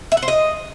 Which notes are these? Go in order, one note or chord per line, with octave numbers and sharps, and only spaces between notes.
E5
F#5
C5
D#5